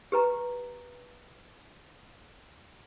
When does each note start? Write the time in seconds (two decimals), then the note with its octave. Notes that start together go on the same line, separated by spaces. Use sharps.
0.12 G4 B4 A#5